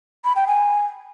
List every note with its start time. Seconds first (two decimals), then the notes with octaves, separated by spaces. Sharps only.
0.25 B5
0.36 G5
0.47 G#5